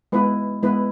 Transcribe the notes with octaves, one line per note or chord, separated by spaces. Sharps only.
G#3 B3 E4 B4
G#3 B3 E4 B4